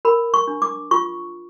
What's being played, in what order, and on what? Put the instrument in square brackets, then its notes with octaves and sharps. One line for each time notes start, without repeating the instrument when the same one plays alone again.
[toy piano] A#4 B5
C#6
D4
D6
F4 C#6